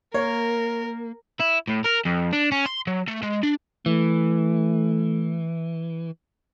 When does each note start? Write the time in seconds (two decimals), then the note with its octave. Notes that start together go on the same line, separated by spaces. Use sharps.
0.14 A#3 A#4 C#5
1.40 E4
1.69 A2
1.85 A#4
2.06 F2
2.33 D4
2.52 C#4
2.66 C6
2.87 F#3
3.08 A3
3.23 G#3
3.43 D4
3.86 E3 A3